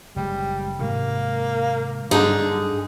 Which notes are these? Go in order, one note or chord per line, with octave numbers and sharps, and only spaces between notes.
F#1 G3 G#3
G#2 C3 D#3 A#3
G2 D3 F#3 G3 D4 D#4 G#4